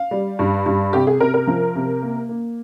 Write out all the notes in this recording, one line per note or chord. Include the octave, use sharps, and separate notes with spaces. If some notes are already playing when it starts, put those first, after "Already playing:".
Already playing: F5
G3
G2
G2
C3 G4
G#4
C3 A#4
A#4
F3
C3
A#3
A#3